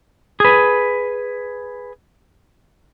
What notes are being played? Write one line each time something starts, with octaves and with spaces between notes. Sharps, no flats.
G#4 B4